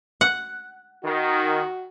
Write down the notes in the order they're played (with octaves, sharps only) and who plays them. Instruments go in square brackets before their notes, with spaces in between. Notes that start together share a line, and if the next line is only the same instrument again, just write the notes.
[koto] F#5
[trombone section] D#3 [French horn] F#4